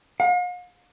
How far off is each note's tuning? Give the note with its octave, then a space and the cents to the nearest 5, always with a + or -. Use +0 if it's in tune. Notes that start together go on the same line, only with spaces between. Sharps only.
F5 +45